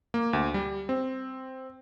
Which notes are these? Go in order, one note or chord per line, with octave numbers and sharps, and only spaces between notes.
A#3
D2
G3
C4